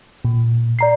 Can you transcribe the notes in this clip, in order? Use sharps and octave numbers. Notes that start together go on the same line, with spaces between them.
A#2
D5 A#5 C7